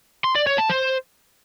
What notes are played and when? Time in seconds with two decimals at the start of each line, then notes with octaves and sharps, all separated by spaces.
0.24 C6
0.35 D5
0.47 C#5
0.58 A5
0.69 C5